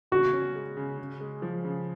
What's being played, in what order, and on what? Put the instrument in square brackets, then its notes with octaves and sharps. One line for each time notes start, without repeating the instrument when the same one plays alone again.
[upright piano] C#3 [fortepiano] F#4
[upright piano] C#4
G#3
C#3
C#3
G#3
F3
C#3